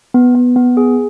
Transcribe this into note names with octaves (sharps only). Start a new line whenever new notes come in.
B3
B3
B3
G#4